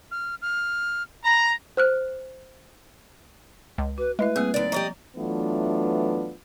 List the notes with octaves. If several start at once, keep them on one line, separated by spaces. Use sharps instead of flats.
F6
F6
A#5 B5
C5 F6 F#6
C#2
F#4 B4
G#3 A3 E4 B4 E5
G3 A#3 C4 G#4
D#2 D5
F3 G4 D5 D#5 A#5
E3 F#3 A3 B3 D4 F4